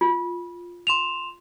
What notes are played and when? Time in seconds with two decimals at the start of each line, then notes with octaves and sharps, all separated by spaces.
0.01 F4
0.87 C6 E7 F7